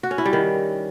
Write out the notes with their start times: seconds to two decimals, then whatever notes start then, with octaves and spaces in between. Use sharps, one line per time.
0.03 F#4
0.11 C#4
0.18 E4
0.25 G3
0.33 D#3